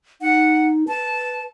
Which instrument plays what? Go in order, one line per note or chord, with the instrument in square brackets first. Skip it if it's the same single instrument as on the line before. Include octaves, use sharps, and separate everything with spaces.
[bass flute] D#4 [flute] F#5
[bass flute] B4 [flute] A5